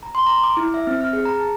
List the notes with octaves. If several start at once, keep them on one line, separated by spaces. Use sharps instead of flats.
A#5
C6
A#5
D6
E4
E5
C4
F6
G#4
A#5
A5